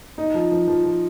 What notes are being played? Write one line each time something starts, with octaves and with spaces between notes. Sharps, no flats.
D#4
F3
F3
F3
F3